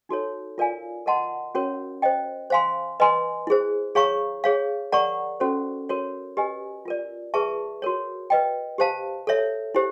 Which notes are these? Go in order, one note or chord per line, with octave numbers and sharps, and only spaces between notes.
D#4 F#4 A4 C#5
F4 A#4 D5 F5 G#5
A#4 D#5 F#5 A5 C6
C#4 F#4 A#4 C#5
C5 D#5 G5
C5 F5 G#5 C6
B4 D#5 G#5 C6
E4 G#4 C5
G#4 C#5 F5 A#5 C#6
G#4 C#5 F5
A#4 D5 F#5 A#5 C#6
C#4 F#4 A4 C5
F#4 A#4 C#5
G4 B4 D#5 G#5
F4 A#4 D5
G#4 B4 E5 A5 C#6
F#4 A#4 C#5
B4 D#5 G5
G4 C5 F5 A5
A4 C#5 E5
E4 G4 C5